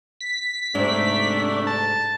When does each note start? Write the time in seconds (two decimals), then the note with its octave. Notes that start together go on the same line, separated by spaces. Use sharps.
0.20 B6
0.75 G#2 C3 A3 D4
1.67 A5